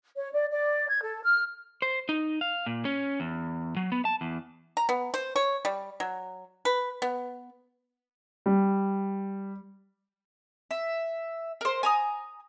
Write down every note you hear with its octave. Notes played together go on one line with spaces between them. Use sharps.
C#5
D5
D5
G#6
A4
F6
C5
D#4
F5
A#2
C#4
E2
F#3
B3
A5
E2
A#5
B3
C5
C#5
G3
F#3
B4
B3
G3
E5
A#4 C5
G#5 A#5 D#6